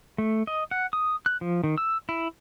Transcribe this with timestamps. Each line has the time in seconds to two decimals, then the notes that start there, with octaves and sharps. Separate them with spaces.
0.18 A3
0.47 D#5
0.71 F#5
0.93 D#6
1.26 F#6
1.41 F3
1.64 D#3
1.78 E6
2.09 E4